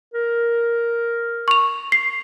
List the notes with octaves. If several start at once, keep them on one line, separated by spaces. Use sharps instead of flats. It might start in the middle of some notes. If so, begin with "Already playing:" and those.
A#4
C#6 F7
C7